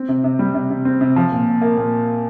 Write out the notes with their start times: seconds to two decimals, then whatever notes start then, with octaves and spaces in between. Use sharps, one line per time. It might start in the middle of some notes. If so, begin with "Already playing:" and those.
Already playing: C4
0.08 C3
0.24 C3
0.39 G3
0.54 C3
0.70 C3
0.85 C4
1.01 C3
1.16 F3
1.32 A#2
1.47 A#2
1.62 A#3
1.77 A#2